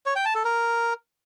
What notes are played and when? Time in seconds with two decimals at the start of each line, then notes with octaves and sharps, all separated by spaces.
0.06 C#5
0.16 G5
0.25 A5
0.35 A4
0.45 A#4